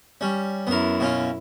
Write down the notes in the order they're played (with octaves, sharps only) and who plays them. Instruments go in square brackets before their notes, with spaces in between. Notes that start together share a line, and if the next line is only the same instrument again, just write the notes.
[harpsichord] G3 C#4
[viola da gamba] F#2 E4 [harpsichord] B3 A#4
[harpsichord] B2 C#4 F4